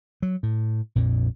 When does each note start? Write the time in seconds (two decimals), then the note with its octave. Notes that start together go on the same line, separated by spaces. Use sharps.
0.22 F#3
0.43 A2
0.95 A#1 F2 A#2